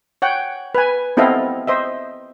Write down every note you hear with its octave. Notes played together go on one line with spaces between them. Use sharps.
C#5 F#5 G5
B4 G#5
B3 C4 E4 A4 D#5 F5
C5 D#5 E5